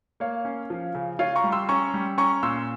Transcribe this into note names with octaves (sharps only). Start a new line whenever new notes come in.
A#3 C#5 F5
C#4
F3
C#3
F4 C#5 F5
A#5 C#6
G3
C6 E6
C#4 A#5 C#6
G3
C#4 A#5 C#6
A#2 C6 E6